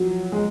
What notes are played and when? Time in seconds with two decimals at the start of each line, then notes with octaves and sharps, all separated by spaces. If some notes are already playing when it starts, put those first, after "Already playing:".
Already playing: F3 F#3
0.32 G#3